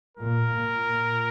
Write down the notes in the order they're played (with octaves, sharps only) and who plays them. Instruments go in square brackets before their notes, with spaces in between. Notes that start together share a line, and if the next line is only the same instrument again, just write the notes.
[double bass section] A#2 [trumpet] A#4
[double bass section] A#2
A#2